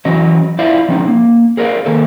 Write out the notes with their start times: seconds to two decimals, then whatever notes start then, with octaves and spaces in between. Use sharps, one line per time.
0.05 E3 F#3 C#4 D#5
0.59 E4 F4 C5 D5 E5 F5
0.89 F3 C4 C#4 D#4
1.08 A#3
1.57 G#4 A#4 B4 D5 F5
1.85 D#3 A#3 A4 A#4